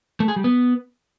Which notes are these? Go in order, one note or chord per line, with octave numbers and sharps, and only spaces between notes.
A3
G#4
G3
B3